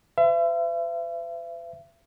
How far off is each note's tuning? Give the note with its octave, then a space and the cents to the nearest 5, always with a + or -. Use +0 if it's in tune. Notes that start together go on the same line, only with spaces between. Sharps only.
C5 -45 E5 +40